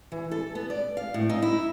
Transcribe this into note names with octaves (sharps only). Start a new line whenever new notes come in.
E3
A4
B3
D5
F5
A2
D#4
E4